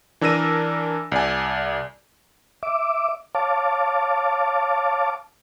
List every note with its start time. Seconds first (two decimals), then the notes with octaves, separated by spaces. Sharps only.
0.21 E3 D4 A#4 E6 A#6 D#7
1.12 C2 D5 G#5
2.63 E5 D6
3.35 C#5 F5 A5 D6